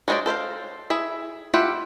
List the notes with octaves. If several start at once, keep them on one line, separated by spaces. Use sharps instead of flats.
F#3 G#3 F4 C5 D5
A4 C5 E5 F5
E4 G#4 E5
E4 F4 G4 E5 F#5